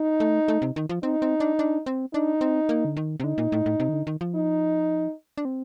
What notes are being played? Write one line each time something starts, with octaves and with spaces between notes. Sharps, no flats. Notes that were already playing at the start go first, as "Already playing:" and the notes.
Already playing: D#4
A3
A3
C3
D#3
F3
C4 D#4
C4
D4
D4
C4
D4 D#4
C4
A#3
D3
D#3
C3
D3 D#4
A#2
A2
A2
C3
D#3
D3
D#3
F3
D#4
D4
C4